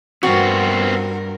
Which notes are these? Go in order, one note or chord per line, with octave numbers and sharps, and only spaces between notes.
G2 B3 C4 F4 F#4 A#4